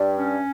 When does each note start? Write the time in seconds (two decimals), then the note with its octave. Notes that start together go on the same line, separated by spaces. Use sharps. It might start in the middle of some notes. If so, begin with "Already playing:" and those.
Already playing: G2 G3
0.16 C#4